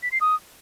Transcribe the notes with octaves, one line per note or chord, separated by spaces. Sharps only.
B6
C7
D#6